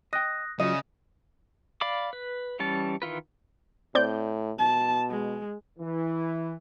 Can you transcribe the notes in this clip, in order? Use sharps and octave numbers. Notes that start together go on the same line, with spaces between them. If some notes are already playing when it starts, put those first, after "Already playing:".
D#5 G5 D#6 F#6 A#6
C#3 F#3 F4 F#4 D#5 D#6
D5 F5 B5 D6
B4
E3 G3 C#4 A5
D#3 E3 F4 B4
A2 C4 D5 G6
B2 A5
G#3
E3